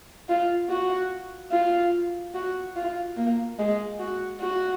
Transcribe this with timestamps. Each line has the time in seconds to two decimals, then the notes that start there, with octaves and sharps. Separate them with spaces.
0.29 F4
0.69 F#4
1.52 F4
2.35 F#4
2.76 F4
3.17 A#3
3.59 G#3
3.99 F#4
4.41 F#4